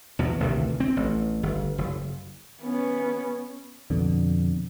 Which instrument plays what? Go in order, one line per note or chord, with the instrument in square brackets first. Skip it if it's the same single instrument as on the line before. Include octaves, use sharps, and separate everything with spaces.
[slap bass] E2 B2
A1 D2 C3 D#3
C4
A1
G1
F#1
[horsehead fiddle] B3 C#4
[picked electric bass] F2 B2 D3